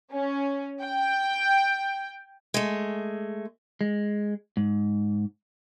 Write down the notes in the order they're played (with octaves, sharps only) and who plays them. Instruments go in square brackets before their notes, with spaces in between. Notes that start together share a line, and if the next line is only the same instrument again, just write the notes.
[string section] C#4
G5
[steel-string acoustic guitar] G#3 A3
[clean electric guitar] G#3
G#2